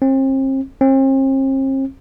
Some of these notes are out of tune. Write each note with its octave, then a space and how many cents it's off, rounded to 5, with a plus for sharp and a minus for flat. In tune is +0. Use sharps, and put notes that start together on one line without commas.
C4 +40
C4 +45